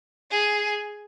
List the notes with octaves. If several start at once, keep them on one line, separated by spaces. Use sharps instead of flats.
G#4